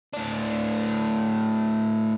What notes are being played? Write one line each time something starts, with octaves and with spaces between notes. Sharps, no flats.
A2 D4